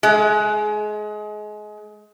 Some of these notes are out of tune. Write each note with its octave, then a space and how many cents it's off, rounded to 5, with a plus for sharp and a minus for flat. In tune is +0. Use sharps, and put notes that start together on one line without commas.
G#3 +25